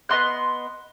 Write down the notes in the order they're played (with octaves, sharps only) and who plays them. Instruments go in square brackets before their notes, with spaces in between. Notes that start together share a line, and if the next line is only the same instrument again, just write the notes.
[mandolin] B3 D#5 C6 F#6